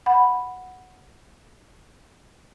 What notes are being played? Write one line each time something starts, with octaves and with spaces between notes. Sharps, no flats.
F#5 B5